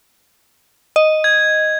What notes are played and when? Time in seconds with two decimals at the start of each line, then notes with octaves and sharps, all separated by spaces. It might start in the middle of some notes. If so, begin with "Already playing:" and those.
0.96 D#5
1.24 G#6